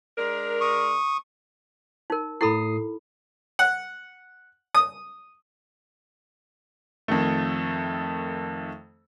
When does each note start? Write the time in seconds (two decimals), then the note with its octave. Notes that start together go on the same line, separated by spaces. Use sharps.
0.17 G#3 D4 A#4
0.61 C#6 D#6
2.10 D#4 A#4
2.41 A2 E4 A4 B5 D#6 C7
3.59 F#5
4.75 D#6
7.08 F2 D#3 A3